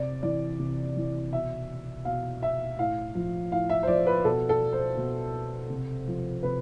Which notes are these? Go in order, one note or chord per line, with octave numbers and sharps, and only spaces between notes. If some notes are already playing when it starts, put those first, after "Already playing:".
Already playing: C3 D5
E3 D5
C3
E3
B2 E5
B2 F5
E5
A2 F5
F3
A2 F5
E5
C5
F3 D5
B4
B2 A4
A4
C5
B2
C3
F3
C3 B4